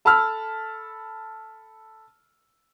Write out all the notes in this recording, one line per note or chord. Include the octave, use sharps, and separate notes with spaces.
A4 A5 B5 E6 F6